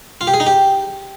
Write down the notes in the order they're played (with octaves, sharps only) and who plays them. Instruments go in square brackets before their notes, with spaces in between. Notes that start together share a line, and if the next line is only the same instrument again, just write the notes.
[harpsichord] F4
G4
G#4
D#4
G4